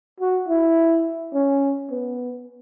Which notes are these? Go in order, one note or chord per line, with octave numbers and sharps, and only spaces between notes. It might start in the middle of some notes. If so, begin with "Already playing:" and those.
F#4
E4
C#4
B3